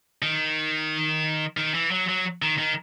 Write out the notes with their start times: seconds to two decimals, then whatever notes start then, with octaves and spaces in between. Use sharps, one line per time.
0.22 D#3
1.57 D#3
1.74 E3
1.91 F#3
2.09 F#3
2.42 D#3
2.58 D#3